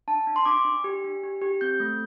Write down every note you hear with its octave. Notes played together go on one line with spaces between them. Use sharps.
D4 A5
D4
C6
D4 D6
D4
G4
D4
G4
G4
C4 G6
A3